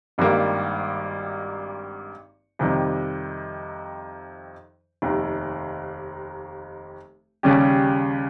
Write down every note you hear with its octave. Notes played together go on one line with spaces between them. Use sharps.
G#1 G2 D#3 G3 A#3
F2 C3 D#3 G3
F1 D#2 D#3
D#2 C#3 G3 C#4 G4